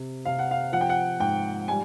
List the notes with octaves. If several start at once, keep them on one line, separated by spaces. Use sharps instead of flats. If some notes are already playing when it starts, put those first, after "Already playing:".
Already playing: C3
C3 F5
F#5
F5
F3 F#5
G5
F#5
G#2 G5
G3 G#5